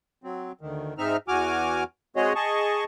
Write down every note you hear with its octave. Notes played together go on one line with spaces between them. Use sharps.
F#3 C4
D2 D#3
G#2 C4 D#4 E5 F6
E2 F#4 G#5 D6 F6
G#3 C4 F#4 G#4 C#5 D#5
G#4 D#5 A5 C#6